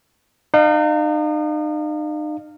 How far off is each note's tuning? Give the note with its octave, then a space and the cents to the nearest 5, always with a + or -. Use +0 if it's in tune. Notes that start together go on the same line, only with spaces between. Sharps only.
D#4 -40 F5 +0